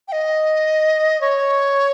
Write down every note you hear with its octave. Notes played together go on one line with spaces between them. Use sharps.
G5
D#5
C#5